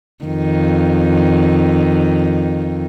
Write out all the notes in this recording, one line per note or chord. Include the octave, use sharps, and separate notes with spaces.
F2 D#3